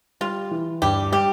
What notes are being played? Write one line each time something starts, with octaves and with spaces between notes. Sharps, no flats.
G3 F4
E3
G2 G4
G3 G4